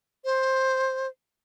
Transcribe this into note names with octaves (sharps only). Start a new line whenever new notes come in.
C5